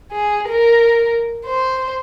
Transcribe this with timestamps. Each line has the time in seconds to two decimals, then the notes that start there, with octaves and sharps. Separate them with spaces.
0.12 G#4
0.49 A#4
1.46 C5